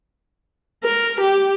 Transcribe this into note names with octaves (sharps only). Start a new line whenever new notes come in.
A#4
G4